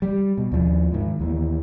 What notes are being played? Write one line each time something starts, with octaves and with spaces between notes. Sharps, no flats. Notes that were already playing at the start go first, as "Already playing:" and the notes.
G3
B2
D#2 F3
G#2 D#3
D#2 E3